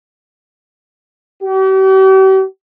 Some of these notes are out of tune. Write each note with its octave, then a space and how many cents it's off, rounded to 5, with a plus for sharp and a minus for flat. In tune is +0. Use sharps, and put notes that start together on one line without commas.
G4 -45